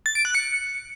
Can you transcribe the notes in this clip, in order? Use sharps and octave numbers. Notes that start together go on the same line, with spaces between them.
A6
D7
F#6
C#7